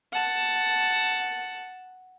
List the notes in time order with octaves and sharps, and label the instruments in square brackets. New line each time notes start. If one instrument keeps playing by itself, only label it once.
[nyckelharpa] F#5 A5